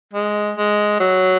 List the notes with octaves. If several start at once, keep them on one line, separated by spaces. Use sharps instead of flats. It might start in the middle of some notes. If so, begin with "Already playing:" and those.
G#3
G#3
F#3